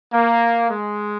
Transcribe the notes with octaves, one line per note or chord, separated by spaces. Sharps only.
A#3
G#3